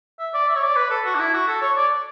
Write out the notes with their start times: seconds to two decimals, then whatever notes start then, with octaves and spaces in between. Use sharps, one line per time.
0.19 E5
0.34 D5
0.48 E5
0.55 C#5
0.63 D5
0.76 B4
0.90 A4
1.05 F#4
1.15 D4
1.20 E4
1.34 F#4
1.48 A4
1.61 C#5
1.76 D5